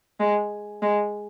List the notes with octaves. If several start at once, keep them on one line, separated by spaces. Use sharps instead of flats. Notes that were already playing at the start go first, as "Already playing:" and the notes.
G#3
G#3